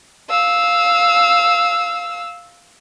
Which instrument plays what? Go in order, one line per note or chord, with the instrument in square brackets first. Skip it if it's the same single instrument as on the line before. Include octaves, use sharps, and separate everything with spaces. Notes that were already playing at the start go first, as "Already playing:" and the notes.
[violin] F5 E6